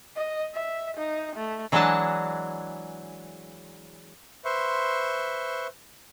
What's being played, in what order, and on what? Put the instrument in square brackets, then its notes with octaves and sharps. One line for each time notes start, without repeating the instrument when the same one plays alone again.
[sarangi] D#5
E5
D#4
A3
[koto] E3 F#3 G#3 D4 D#5 A5
[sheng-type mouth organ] B4 C5 E5 C6 C#6